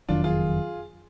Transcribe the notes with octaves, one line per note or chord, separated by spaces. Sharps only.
F#1 F2 D#3 F#3 D4 F4
F4 G#4